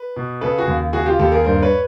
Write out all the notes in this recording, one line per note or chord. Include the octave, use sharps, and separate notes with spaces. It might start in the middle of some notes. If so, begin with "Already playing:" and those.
Already playing: B4
B2
C#3 A4 B4
F#4 G#4
D#2
C#3 F#4 G#4
F4 G4
D#2 G4 A4
G#4 A#4
G2 A#4 C5
B4 C#5